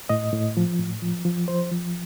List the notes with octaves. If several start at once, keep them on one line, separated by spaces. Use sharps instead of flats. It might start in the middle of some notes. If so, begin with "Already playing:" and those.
A2 D#5
A2
F3
A2
F3
F3
F3 C5
F3